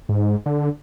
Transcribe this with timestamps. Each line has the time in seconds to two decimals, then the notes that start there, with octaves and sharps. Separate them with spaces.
0.09 G#2
0.46 D3